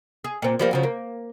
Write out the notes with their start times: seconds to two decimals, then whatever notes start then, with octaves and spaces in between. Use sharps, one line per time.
0.24 G#4
0.42 A#2 C4
0.59 F3 G3 A#3
0.71 F#2 C#3 F3
0.83 A#3